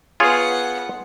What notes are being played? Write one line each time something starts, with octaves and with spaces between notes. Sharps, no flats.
B3 F4 G#4 C#5 F#5